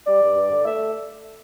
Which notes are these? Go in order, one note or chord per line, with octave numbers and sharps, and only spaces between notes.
G3 D5
G2
G2
D3
A3 E5